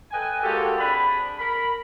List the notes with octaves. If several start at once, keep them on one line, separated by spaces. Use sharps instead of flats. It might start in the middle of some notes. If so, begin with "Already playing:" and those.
A4 B4 D#5 G5 G#5
G#3 A#3 C#4 F#4 G4 A4
C4 D4 G#4 B5
A#4 B5